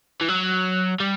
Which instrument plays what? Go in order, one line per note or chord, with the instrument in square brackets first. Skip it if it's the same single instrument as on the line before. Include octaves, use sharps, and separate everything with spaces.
[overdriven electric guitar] E3
F#3
G3